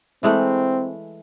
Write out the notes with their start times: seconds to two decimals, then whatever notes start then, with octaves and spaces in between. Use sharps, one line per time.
0.23 E3 G#3 A3 C4